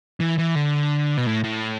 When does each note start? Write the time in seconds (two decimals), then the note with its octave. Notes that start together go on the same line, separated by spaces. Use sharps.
0.20 E3
0.38 E3
0.55 D3
1.17 B2
1.26 A2
1.44 A2